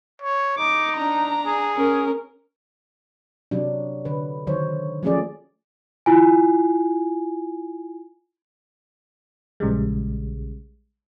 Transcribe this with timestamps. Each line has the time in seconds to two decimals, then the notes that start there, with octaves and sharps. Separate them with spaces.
0.22 C#5
0.58 D#4 D6
0.97 D4 A#5
1.46 G#4
1.76 C#4 A#4
3.51 C3 F#3 D4
4.05 D3 B4
4.47 D3 D#3 F#3 C5 C#5
5.03 F3 F#3 A3 C#4 G#4 D5
6.06 E4 F4 G#5
9.60 A#1 C#3 G3 G#3